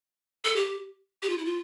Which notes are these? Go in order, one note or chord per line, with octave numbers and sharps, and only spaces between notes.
A4
G4
G4
F4
E4
F4